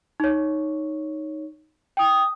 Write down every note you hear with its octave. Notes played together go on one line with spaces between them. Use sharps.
D#4 C#5
G5 D#6